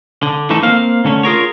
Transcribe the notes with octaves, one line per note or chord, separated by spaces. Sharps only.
D3
E3 A3 D#4 A4
A#3 C4 F5
D3 A3 C#4
F4 G#4 A#4 C#5